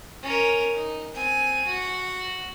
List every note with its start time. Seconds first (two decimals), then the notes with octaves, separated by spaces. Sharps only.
0.23 C#4 A#4
0.75 D#4
1.14 C4 G#5
1.66 F#4